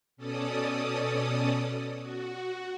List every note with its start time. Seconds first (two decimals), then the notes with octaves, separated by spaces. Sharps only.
0.17 B2 C#4 A4 D5 D#6
2.01 F#4